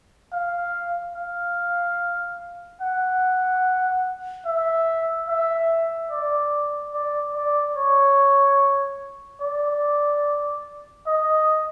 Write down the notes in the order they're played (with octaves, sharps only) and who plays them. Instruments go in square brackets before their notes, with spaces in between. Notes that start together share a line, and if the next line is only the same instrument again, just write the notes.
[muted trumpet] F5
F5
F#5
E5
E5
D5
D5
D5
C#5
D5
D#5